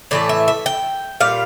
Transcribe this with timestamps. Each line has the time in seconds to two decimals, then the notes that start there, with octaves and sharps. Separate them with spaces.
0.11 A2 E3 A3 D5
0.29 E5
0.48 E5
0.66 G5
1.21 A#2 G3 F5